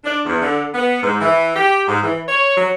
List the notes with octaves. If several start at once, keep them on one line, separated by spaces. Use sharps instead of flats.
D4
E2
D3
B3
G#2
E3
G4
G#2
E3
C#5
F#3